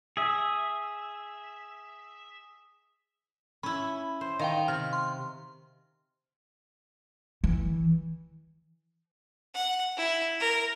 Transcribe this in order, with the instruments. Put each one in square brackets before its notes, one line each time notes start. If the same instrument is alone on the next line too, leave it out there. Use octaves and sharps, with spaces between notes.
[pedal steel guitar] G#4 E5
[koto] C#4 E4 [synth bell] B5
[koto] C5
[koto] D#3 [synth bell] D#5 F5 G5
[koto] C3 [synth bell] F6
[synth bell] C6
[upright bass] E3
[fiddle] F#5
E4
A#4